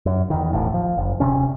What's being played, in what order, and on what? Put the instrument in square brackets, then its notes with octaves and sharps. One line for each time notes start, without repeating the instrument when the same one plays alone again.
[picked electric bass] F#2
E2 D#3
E1 A1 A2
F3
F#1
D#1 C3 C#4